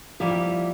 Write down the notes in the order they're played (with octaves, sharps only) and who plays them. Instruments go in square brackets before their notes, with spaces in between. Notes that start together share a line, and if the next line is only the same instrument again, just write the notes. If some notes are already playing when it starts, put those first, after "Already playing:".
[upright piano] F3 [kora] G3 A#3 E4